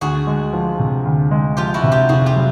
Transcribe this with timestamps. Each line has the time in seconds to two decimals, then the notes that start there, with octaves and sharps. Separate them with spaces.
0.01 D2 F#4 G#4
0.27 G#3
0.53 F3
0.79 C3
1.05 D2
1.31 G#3
1.57 F3 F4 G4
1.74 E4 F#4
1.83 C3
1.92 F4 G4
2.09 F1 F#4 G#4
2.26 F4 G4
2.35 F#3